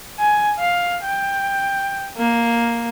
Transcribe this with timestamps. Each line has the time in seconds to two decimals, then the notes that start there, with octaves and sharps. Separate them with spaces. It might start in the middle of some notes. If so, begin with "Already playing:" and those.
0.19 G#5
0.59 F5
1.04 G5
2.17 A#3